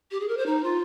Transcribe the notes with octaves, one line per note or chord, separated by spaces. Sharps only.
G4
G#4
A#4
C5
D#4
F4